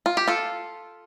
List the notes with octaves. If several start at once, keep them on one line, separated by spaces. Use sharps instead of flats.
F4
G4
F4 A4